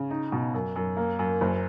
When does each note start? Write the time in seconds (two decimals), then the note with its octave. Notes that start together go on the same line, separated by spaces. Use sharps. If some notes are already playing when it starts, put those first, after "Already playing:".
Already playing: C#3
0.11 D#4
0.32 B2
0.54 F#2
0.76 F#2
0.97 A#3
1.19 F#2
1.41 F#1